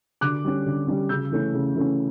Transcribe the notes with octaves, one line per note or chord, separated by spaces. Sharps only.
D3 D6 F#6
G3 C#4
D3
G3 C#4
C#3 E6 G6
E3 A3 C#4
C#3
E3 A3 C#4